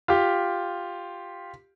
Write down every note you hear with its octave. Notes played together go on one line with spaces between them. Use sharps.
F4 G4